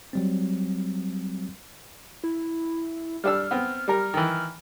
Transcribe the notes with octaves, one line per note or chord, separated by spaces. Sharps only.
F#3 G3 C4
E4
G3 D4 E6 F6
B3 C4
G3 A#4
D#3 E3